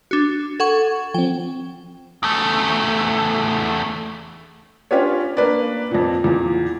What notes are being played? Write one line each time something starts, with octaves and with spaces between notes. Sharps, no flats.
D4 F#4
A4 F#5 C#6 G#6
F3 C4 G5
E2 A3
C#4 D4 F4 G4 B4 C#5
A#3 D4 B4 D5
F2 A#2
E2 A#2